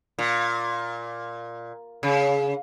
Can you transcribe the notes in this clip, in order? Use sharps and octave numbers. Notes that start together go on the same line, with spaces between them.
A#2
C#3